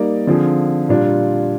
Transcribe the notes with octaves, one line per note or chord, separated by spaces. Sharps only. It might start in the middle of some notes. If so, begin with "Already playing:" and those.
Already playing: G3 A#3 D#4 A#4 D5
D3 F3 C4 F4 G#4
A#2 G3 D4 F4